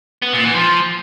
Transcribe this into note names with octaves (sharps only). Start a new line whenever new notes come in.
B3
A#2
E3
F3